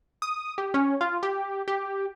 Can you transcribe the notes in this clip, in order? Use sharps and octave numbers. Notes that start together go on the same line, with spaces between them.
D#6
G4
C#4
F4
G4
G4